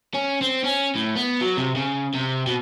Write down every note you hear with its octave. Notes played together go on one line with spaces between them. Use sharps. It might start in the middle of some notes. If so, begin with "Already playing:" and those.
C#4
C4
C#4
A2
B3
F#3
C3
C#3
C3
B2